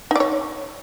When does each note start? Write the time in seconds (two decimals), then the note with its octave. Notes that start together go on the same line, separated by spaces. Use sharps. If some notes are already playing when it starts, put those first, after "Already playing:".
0.11 D#4
0.16 D5
0.20 C#5